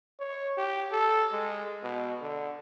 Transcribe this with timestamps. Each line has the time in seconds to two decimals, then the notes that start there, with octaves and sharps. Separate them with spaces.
0.20 C#5
0.57 G4
0.92 A4
1.32 G#3
1.83 B2
2.22 D3